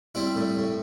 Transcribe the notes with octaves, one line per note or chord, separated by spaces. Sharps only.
G3 C4 E4
A2
A2